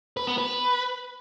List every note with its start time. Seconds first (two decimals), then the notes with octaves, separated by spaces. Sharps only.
0.17 B4
0.27 B3
0.38 B4